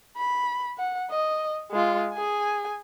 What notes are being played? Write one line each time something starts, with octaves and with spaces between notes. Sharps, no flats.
B5
F#5
D#5
G#3 F4
G#4 G#5